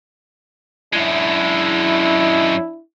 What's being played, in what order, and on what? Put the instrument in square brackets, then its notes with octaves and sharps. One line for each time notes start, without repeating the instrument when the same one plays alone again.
[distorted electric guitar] F#2 G#3 [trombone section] D4 E4